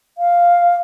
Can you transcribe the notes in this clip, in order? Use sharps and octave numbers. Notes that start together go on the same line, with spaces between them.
F5